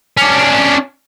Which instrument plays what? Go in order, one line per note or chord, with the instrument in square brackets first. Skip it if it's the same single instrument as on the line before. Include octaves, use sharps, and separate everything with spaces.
[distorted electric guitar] C#4 D4